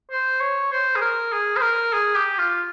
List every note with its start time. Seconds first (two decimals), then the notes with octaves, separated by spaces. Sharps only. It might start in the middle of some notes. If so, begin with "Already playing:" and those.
0.11 C5
0.40 C#5
0.72 C5
0.96 G#4
1.01 A#4
1.32 G#4
1.57 C5
1.62 A#4
1.93 G#4
2.15 G4
2.38 F4